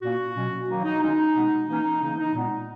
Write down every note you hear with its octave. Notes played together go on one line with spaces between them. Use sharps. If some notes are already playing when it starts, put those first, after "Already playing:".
A#2 A#3 C#4 F#4
B2 F#3 C#4
D#3 F#3 A#3 D#4
D#4
D#3 G#3 C#4 D#4
B2 G#3 B3
E3 A#3 C#4 D#4
C#3 E3 A#3 C#4 D#4
D#4
A#2 G#3 B3